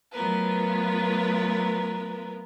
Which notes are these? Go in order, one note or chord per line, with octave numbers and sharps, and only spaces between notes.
F#3 A3 B3 F4 A#4 B4